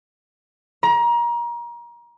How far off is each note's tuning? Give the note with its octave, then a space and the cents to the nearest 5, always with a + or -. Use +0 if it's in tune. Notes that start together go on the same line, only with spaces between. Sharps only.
A#5 +30